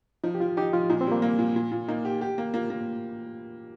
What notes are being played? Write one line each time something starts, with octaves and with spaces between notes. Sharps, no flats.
F3 D#4
G4
F3 F4
D#4 G4
F3 F4
A#2 D#4
C4
G3 A#3
A#3
A#2
A#2
A#2
A#3 D#4
G4
G4
A#3
A#3 F4
A#3